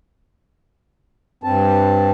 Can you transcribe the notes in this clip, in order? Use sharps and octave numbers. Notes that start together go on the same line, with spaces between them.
G2 C4 A5